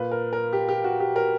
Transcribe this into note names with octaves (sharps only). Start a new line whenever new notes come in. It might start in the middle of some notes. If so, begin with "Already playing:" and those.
Already playing: A#2 B4
A#4
A#4
G4
G4
F#4
G4
A#4